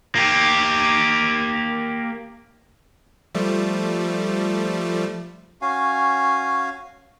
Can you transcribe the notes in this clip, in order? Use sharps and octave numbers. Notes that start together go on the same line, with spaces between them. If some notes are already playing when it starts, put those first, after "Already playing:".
A#3 G4
F3 G3 A3
C#4 F#4 F5 G#5